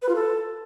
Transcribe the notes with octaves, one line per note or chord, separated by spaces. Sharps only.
B4
F4
A4